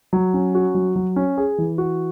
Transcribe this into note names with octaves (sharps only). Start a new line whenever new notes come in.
F#3
C#4
F#4
F#3
F#3
C#4
G#4
E3
F#4